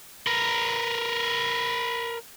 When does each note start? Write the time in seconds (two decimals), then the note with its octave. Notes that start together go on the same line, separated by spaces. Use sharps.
0.27 A#4 B4